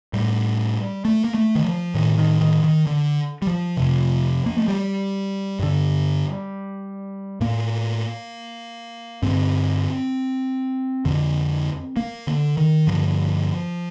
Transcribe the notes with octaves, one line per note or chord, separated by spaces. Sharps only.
A2 G3
A3
A#3
A3
D#3
F3
A2 D#3
D#3
D#3
D#3
D3
G3
F3
F2 C3
A#3
A3
G3
G2 D3
A2 A#3
G2 D3 C4
F2 D3
A#3
D3
D#3
G2 D3 F3